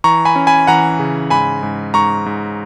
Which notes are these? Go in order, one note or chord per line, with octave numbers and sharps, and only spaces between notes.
E3 A#5 C#6
G#5 B5
C#4
G#5 B5
E3 F#5 A#5
C#3
G#2 G#5 B5
G#2
G#2 A#5 C#6
G#2